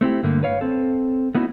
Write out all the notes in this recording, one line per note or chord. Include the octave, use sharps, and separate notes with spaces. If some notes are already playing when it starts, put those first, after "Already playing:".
A3 C4 E4 G4
G2 D3 A3 A#3
B4 C#5 F5
C4 A4
A3 B3 C#4 D#4 E4 F#4